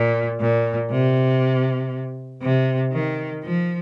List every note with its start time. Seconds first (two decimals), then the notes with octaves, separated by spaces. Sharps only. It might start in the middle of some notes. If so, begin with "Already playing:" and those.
Already playing: A#2
0.40 A#2
0.91 C3
2.42 C3
2.93 D#3
3.44 F3